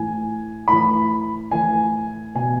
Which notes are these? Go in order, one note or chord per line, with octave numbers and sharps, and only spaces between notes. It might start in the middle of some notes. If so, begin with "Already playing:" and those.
Already playing: A2 E3 G#5
A2 E3 B5
A2 E3 G#5
B2 G#5